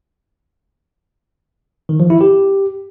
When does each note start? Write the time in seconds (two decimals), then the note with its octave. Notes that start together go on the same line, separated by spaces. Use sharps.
1.89 D#3
2.00 F3
2.10 E4
2.21 G4